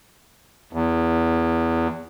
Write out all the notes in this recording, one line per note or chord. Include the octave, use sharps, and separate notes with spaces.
E2